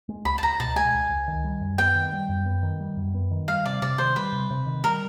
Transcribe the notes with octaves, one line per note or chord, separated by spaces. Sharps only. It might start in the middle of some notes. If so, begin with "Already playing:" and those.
G#3
C#2 B5
A5
C#2 A#5
B2 A5
G#3 G#5
C#2
C#2
D#3
G3
F#2
B3 G5
D#3
G3
F#2
B3
D#3
G3
F#2
B3
D#3
G3 F5
C3 D5
C3 D5
D#3 C5
G3 B4
C3
C3
D#3
G3 A#4